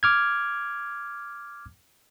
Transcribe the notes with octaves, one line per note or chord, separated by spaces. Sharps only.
D6 F6 G#6